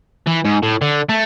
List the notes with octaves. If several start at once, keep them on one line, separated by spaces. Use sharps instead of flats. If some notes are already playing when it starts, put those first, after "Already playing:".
E3
G#2
A2
D3
A3